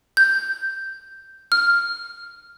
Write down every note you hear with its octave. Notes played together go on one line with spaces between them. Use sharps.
G6
F6